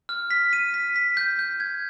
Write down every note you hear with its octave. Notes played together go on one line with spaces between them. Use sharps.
F6
B6
D#7
B6
B6
G6
G6
G#6